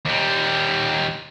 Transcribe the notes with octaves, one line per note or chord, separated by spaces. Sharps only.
D#2 G3